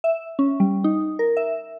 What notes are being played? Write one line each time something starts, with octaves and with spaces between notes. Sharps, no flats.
E5
C#4
G3
D#4
A#4
E5